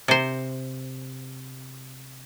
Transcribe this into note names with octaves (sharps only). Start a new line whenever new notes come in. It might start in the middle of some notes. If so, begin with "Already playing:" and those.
C3 C5